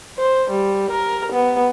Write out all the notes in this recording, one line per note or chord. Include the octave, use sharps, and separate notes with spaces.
C5
G3
A#4
B3